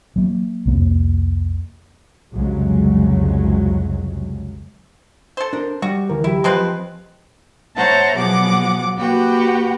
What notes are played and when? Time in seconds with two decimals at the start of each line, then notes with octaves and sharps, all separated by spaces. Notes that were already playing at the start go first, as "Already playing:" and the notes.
0.16 F#3 A#3
0.65 C2 F2 A#3
2.33 C2 F2 C#3 F#3 G#3
5.37 A4 C5
5.53 D4 A#4
5.82 G3 F#4
6.10 D2 E3 A#4
6.24 F#3 E4 G4
6.44 F3 G#3 C4 B4 A5
7.76 C5 C#5 E5 F#5 A5 A#5
8.16 B2 F3 F#3 G#4 F#5 D6
8.96 A#3 F#4 G4 B4 F#5 G5